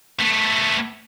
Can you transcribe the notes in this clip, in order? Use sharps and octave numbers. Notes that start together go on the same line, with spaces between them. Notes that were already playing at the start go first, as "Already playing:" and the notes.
A3 B3